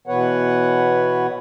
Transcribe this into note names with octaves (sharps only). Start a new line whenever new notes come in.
B2 E3 B3 B4 C#5 F#5